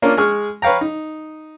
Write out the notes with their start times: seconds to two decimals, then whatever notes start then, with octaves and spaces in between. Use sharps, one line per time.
0.02 A#3 C#4 D4 F4 A#4
0.18 G#3 G#4 C#6 F6
0.62 B4 C#5 F5 G5 A#5
0.81 D#4